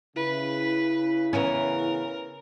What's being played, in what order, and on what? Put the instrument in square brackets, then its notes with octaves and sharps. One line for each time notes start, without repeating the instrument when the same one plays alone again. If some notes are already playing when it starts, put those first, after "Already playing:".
[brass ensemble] C#3 [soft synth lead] E4 [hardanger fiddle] B4
[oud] E3 B3 C#4 [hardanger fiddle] A#4